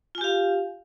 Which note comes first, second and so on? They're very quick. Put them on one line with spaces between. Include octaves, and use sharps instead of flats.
F4 G#5 G4 F5